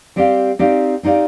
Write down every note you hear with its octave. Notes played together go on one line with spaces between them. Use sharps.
G3 C4 G4 D5 F5
C4 D#4 G4 D5 F5
C4 D#4 G4 D5 F5